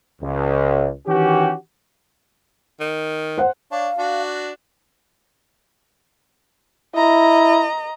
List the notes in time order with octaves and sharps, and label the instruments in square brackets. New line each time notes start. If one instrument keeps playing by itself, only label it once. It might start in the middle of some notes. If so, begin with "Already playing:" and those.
[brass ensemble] C#2
D#3 E3 C#4 F#4 G4
[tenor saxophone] D#3
[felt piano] C5 F#5
[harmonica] D4 C#5 [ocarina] F5
[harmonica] D4 F#4
[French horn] E4 [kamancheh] D#5 A#5